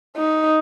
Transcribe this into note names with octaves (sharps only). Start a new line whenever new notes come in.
D#4